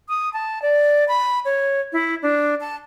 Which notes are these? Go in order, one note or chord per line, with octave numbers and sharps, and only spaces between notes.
D#6
A5
D5
B5
C#5
E4
D4
A5